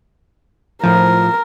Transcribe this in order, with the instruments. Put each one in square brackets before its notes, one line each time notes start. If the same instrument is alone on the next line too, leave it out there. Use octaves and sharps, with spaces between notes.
[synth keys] A2 F3 [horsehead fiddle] A#4